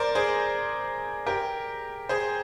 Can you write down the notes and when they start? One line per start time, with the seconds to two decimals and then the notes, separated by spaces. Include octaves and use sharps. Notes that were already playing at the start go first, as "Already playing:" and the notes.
Already playing: A#4 C5 D5
0.15 G#4 C5
1.27 G4 A#4
2.09 G#4 C5